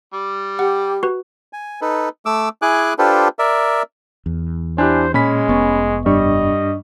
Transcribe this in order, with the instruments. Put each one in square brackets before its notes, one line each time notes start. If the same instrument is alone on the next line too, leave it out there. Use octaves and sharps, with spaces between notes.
[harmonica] G3
[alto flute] G4 [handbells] F#5
[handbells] F#4 B4
[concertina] G#5
D#4 A4 B4
A3 D6 E6
E4 G#4 G#5 D6 F#6
D4 F4 G4 A4 B4 C5
A#4 D5 E5
[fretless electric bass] E2
[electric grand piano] D4 E4 G4 [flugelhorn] C5 [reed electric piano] G#5 F#6
[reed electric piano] A#2 [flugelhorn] G#3 [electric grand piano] C#4 B5 B6
[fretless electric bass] F1 B3 [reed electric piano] C#6
[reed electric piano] G2 D4 C#6 [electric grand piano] G3 [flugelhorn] D#5